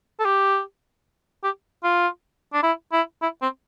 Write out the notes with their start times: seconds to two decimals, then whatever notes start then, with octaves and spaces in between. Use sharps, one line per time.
0.20 A4
0.25 G4
1.44 G4
1.84 F4
2.54 D4
2.63 E4
2.93 E4
3.22 E4
3.42 C4